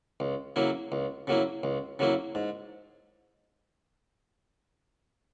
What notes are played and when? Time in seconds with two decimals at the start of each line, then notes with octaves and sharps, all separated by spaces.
0.20 C#2
0.56 C#3 F#3 A#3 E4
0.92 C#2
1.27 C#3 F#3 A#3 E4
1.63 C#2
1.99 C#3 F#3 A#3 E4
2.35 G#2